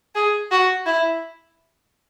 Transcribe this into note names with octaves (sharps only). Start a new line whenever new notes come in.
G#4
F#4
E4